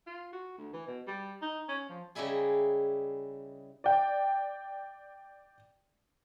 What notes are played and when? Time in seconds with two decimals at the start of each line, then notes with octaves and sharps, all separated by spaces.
0.07 F4
0.32 F#4
0.57 D2
0.73 E3
0.87 B2
1.06 G3
1.42 D#4
1.68 C#4
1.89 F3
2.15 C#3 G3 D#4 E4 G#4
3.84 D5 G5